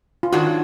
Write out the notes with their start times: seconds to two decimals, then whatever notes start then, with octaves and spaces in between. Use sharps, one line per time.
0.23 F4
0.32 G#2 D#3 F#3 D4 F#4